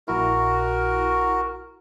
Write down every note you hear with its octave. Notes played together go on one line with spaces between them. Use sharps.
A#1 E4 F#4 A#4